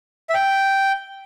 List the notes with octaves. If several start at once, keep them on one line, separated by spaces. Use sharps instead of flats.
E5
G5